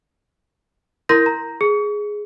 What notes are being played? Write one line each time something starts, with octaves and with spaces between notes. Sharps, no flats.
E4 A#4 C6 G6 A#6
A#5
G#4